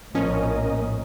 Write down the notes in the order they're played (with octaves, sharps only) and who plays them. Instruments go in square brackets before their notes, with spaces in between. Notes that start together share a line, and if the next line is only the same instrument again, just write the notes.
[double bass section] A#1 A2 [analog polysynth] F3 C#4 [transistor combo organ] A#3 D#5